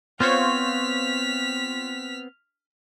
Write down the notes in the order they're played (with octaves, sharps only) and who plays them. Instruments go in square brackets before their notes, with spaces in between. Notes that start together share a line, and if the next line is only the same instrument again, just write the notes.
[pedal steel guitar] B3 C4 [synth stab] F4 C5 C#5 [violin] F6 B6